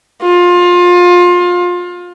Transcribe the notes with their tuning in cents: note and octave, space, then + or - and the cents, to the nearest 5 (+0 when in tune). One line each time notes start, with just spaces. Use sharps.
F4 +25